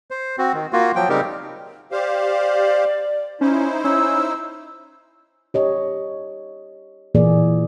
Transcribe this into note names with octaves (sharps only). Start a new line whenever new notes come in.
C5
C4 F#4
D#3
A#3 F4 F#4
F3 F#3 G5
C#3 G3 C4 D#4 G4 A#4
G4 C5 D5 F5
C#4 D#4 E4 C5
C#4 E6
G4 C#5 D#5
A#2 E3 A#3 G#4 D5